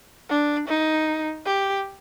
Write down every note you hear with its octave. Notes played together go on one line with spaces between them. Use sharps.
D4
D#4
G4